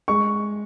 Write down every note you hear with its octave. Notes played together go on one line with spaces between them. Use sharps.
G#3 C#6